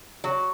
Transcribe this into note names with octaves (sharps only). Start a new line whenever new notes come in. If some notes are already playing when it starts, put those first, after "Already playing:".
F#3